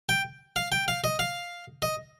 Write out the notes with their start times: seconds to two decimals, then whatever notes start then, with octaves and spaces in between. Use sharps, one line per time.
0.09 G5
0.56 F5
0.72 G5
0.88 F5
1.04 D#5
1.19 F5
1.82 D#5